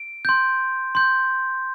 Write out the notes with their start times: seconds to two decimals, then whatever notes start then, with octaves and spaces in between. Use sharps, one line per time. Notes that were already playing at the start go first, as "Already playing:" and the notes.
Already playing: D7
0.25 C6 G6
0.95 C6 G6